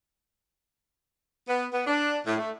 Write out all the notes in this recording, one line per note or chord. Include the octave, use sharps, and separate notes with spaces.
B3
B3
D4
A2
A3